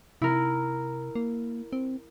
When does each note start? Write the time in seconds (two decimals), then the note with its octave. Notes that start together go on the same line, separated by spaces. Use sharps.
0.22 C3 E4 A#4
1.15 A#3
1.73 C4